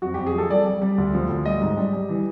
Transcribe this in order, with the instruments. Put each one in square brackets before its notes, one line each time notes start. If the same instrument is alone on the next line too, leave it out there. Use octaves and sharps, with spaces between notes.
[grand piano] F2 F#4
F2 G4
G#4
F3 A4
G3 D5
G3
G3
D2
F3
D2
G3 D#5
G#2
G3
G3
E3